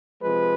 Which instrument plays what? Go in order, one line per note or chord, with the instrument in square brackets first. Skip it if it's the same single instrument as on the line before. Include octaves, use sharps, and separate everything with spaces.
[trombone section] C3 F3 G#3 B4